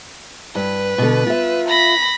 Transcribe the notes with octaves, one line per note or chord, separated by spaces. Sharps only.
G2 B4
B2 D3
F4 E5
B5 A#6